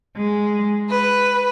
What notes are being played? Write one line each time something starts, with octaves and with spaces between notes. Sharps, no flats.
G#3
B4